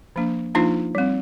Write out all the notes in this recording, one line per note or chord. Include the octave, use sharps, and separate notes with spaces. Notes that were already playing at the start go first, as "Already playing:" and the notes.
F3 A#3 D4
F3 A#3 D4 D#4 F4
G3 C4